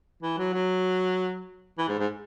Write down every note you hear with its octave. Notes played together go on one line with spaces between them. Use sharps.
E3
F#3
F#3
E3
G#2
G#2